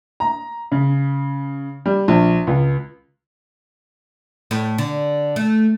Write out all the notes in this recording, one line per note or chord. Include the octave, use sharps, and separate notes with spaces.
A#5
C#3
G3
A#1
C#2
A2
D3
A3